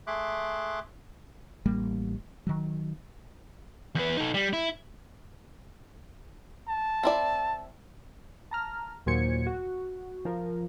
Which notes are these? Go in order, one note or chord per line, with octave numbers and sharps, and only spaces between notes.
A3 G#4 E5 C6 D6 F#6
A1 G3 A#3
D#3 F#3
E2 B4
D#4 A4
G3
E4
A5
C4 E4 D5
A5 A#5 F6
D#2 A#2 F#3 C5 G#6 C#7
F#4
F3 A#4